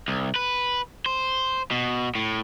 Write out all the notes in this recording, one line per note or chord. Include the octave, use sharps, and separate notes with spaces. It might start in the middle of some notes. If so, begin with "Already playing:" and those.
C2
B4
C5
B2
A2